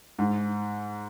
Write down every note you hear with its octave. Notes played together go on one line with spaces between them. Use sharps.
G#2